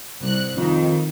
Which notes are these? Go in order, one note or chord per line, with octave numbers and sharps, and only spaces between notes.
C2 F#6
F2 D#3